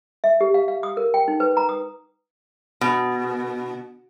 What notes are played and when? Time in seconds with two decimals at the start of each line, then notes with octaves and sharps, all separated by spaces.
0.24 E5
0.41 G4
0.54 F5
0.68 F5
0.83 D#6
0.97 A#4
1.14 G5
1.28 D#4
1.40 B4
1.57 A#5
1.69 D#6
2.81 B2